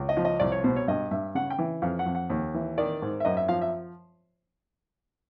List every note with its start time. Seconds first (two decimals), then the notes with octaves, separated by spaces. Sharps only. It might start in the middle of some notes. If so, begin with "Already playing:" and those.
Already playing: C#2
0.09 D#5
0.17 F3
0.25 D#5
0.40 C2 D5
0.52 C#5
0.64 B2 C5
0.76 C#5
0.88 G2 D#5
1.11 G2 E5
1.35 C#3 F#5
1.50 G5
1.59 E3
1.82 F2 F5
1.99 F#5
2.06 F2
2.15 F#5
2.30 D#2
2.54 E3
2.78 D#3 D5
3.02 G#2
3.20 E5
3.25 F#2 D#5
3.37 E5
3.48 F3 F5
3.62 E5